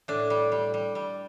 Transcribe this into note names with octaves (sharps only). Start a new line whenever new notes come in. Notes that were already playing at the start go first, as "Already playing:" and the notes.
A2 D4
G3
G3
G3
G3